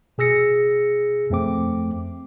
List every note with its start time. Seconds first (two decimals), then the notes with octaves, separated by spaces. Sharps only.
0.18 B2 G#4 E6 A#6 C#7
1.30 F2 A3 C4 D6